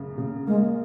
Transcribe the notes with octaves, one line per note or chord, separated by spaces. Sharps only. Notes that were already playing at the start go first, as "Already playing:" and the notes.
Already playing: F#2 C#3
C#3
G#3 A#3